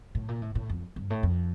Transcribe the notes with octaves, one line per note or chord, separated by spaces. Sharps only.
A2
A#2
A2
A2
F2
G2
A2
F2